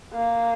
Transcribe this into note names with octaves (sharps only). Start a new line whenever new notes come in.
A#3